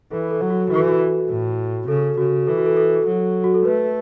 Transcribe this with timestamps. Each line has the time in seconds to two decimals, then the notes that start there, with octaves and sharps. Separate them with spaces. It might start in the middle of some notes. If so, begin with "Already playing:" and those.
0.11 E3 A4
0.31 A4
0.41 F#3
0.50 F#4
0.70 E3 F#4
0.79 A4
0.88 F#4
1.29 A2
1.88 C#3 A4
2.18 C#3 F#4
2.47 E3 A4
2.57 F#4
2.66 A4
2.77 A4
3.06 F#3
3.44 F#4
3.54 A4
3.65 A3 B4